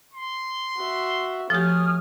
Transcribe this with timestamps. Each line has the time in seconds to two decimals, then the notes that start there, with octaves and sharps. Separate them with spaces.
0.14 C6
0.77 F#4 E5
1.50 F3 A3 G4 C#5 G#5 D#6 F6